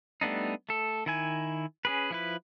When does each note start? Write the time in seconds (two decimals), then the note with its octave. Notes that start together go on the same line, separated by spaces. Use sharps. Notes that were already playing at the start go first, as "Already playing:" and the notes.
0.21 G3 A3 B3 D4 D#4
0.69 A3 A4
1.06 D#3 E4 G#5
1.85 C#4 G#4 B4
2.10 F3 E4 B4